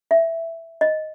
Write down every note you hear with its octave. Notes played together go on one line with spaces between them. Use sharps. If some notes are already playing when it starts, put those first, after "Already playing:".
E5
D#5